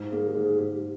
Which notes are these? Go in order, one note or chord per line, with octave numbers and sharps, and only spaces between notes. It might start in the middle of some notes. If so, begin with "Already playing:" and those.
Already playing: G#2
A#3 G#4
G4
G#2 G#4
G#2 G4